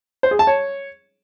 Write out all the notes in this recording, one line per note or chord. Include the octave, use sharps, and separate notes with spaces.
C5
G#4
A5
C#5